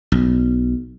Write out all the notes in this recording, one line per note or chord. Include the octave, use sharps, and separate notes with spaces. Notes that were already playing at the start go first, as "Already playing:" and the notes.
B1